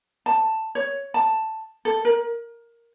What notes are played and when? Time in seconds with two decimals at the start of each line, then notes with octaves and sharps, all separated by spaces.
0.26 A5
0.75 C#5
1.14 A5
1.85 A4
2.05 A#4